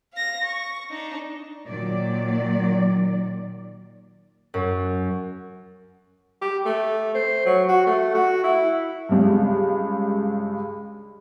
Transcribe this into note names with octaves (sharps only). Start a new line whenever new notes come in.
F5 A#6
C#6
D4 D#4
A#2 D#3 F#3 D5
F#2
G4
A3
C5
F#3
F#4
A3
F#4
E4
C#2 G2